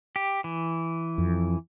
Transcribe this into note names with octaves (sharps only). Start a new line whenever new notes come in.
G4
E3
F2